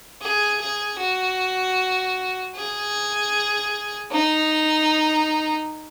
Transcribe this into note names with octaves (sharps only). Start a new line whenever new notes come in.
G#4
G#4
F#4
G#4
D#4